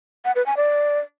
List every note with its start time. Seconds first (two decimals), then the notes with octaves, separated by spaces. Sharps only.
0.25 F#5
0.36 B4
0.46 G#5
0.57 D5